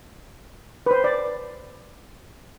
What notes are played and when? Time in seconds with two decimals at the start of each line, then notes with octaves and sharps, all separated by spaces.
0.86 B4
0.91 C5
1.04 D5